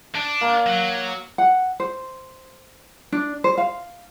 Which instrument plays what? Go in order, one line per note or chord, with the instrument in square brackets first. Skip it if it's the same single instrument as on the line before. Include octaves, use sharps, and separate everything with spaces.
[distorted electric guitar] D4
[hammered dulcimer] A#3
[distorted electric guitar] F#3
[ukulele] F#5
C5
D4
C5
F5